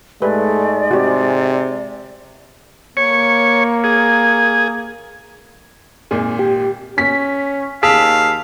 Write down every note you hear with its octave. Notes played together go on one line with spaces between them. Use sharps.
G#2 G#3 A3 G4 B4 D5
C3 F#4 G4
A#3 C#5
G#4
G#1 A#2 G#4
G4
C#4 B6
D#2 G#4 F5 A5 E6 B6